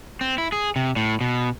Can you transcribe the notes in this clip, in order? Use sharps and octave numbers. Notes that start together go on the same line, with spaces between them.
C4
E4
G#4
C3
A2
B2